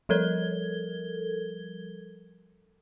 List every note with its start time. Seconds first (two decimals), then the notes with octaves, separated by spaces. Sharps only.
0.09 F3 G3 A4 A#4 G#6 G7